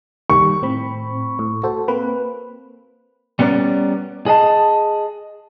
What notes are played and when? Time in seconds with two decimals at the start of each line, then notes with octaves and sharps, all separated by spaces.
0.30 D#3 G3 A#3 C#6
0.62 A2 C4 B5
1.39 A2
1.63 F#4 A4 C5
1.88 A#3 C4 B4
3.39 G3 B3 C#4 A#4 D5
4.26 G#4 D#5 A5